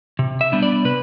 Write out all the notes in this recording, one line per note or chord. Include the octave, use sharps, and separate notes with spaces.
C3
E5
G3 B3 D4
D5
C3 B4